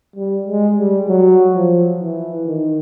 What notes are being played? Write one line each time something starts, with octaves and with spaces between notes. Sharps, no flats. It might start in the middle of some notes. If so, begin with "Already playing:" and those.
G3
G#3
G3
F#3
F3
E3
D#3